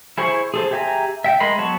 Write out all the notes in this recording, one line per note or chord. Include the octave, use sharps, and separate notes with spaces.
E4 G#4 C5 B5 C#6
G#4 A4 C5
G4 G#4 E5 G#5 A#5
E5 G5
G#3 A#4 D#5 B5 C6
F#3 B3 F#4 C#5 A5